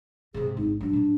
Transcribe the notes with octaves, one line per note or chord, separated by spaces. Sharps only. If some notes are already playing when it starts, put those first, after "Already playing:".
G#2 C3 G#4
G#1 D#4
F#2 F#3 D4
A2 F#3